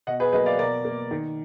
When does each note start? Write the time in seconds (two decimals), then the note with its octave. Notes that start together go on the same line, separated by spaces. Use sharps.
0.07 B2 D#5 F#5
0.20 G#4 B4
0.32 F#3 A#3 B4 D#5
0.46 D5 F5
0.59 B2 A#4 D5
0.85 A#3
1.11 D#3